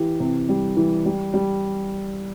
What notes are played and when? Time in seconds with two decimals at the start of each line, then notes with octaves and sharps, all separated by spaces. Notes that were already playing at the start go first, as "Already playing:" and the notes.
Already playing: E3 G4
0.20 C3
0.49 G3
0.77 E3
1.05 G3
1.33 G3